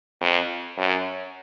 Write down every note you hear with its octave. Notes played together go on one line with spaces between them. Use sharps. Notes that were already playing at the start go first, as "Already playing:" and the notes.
F2
F#2